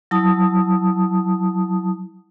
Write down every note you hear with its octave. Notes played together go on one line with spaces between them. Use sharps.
F#3 E4 A5 D#6